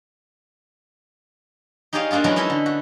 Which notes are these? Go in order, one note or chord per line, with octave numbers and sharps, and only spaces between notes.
D#4 G4 G#4 C#5 D5 F5
A3 A#3 D4 D#4 F4
E3 F#3 G#3 B3 C#4 A#4
D#4 E4 A4 E5
D3
F#4